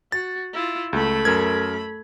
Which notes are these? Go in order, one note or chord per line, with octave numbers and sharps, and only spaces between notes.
F#4 A6
E4 F4
C#2 A3 B5
F#2 A#4 G#6